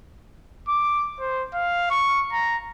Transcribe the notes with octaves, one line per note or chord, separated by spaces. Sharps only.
D6
C5
F5
C#6
A#5